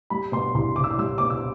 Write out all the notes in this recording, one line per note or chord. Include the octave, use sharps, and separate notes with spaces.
G3 B5
B2 C6
C2 C6
C2 D6
E6
D6
G3 E6
B2 D6
E6